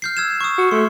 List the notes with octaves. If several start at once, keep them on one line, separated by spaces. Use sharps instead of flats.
F6 G6 C7
E6 G#6 E7
C#6 D#6
F#4
A3 C6